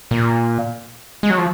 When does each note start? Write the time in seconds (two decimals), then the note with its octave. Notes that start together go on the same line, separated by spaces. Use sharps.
0.11 A#2
1.23 G#3
1.30 F#3
1.38 F3